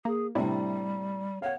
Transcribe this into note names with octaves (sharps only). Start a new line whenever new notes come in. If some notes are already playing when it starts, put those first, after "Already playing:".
A#3 G#4
A2 C3 G3 D4 E4
C#5 F5 F#5